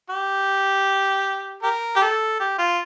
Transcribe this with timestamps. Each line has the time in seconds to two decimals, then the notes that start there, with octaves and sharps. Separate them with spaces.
0.10 G4
1.63 G4 A#4
1.96 G4
2.01 A4
2.40 G4
2.59 F4